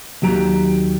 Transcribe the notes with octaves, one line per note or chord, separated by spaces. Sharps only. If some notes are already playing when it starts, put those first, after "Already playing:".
D#2 F#3 G4 A#5